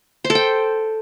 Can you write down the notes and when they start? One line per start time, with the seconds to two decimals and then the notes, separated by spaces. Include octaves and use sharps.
0.25 C5
0.30 A4
0.35 G5